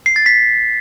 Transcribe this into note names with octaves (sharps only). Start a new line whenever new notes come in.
C7
A6
B6